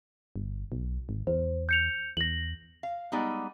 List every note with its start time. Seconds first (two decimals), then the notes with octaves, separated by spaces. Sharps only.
0.36 G1
0.72 B1
1.09 G#1
1.27 E2 C5
1.69 G6 C#7 F7
2.17 E2 A#6 F#7
2.83 F5
3.12 G3 G#3 B3 D#4 D5